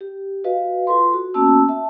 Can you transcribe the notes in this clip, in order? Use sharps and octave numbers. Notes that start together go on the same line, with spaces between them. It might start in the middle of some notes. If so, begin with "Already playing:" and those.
G4
F#4 B4 D#5 F5
F4 A4 B4 C6
F#4
A#3 B3 C#4 F#4 A5 E6
E5 A5